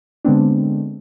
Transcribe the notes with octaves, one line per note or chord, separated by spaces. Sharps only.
D3 G#3 B3 C4 D4